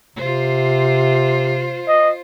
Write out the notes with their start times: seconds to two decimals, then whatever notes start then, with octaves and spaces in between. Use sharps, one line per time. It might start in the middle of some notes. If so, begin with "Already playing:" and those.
0.16 C3 F4 C5
1.88 D#5